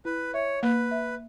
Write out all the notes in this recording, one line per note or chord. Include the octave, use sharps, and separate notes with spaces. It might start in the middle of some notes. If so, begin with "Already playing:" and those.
E4 B4
C#5 E5
A#3 B4
E5